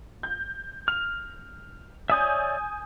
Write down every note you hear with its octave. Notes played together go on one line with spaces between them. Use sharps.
G6
F6 F7
C#5 D5 E5 G#5 D#6 G6